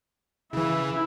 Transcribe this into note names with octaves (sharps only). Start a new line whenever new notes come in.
C#3 E3 E4